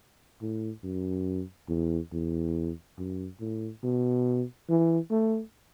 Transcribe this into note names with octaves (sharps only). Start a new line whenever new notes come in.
A2
F#2
E2
E2
F#2
A2
B2
E3
A3